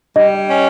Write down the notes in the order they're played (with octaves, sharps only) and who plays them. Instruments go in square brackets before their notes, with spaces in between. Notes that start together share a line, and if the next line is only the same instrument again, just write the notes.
[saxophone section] G3 [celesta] D#5
[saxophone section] C#4